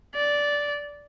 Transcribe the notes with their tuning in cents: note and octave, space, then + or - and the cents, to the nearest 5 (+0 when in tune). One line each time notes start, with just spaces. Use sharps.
D5 -10